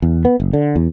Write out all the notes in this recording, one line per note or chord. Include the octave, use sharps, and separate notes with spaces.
E2
B3
F#1
D3
E2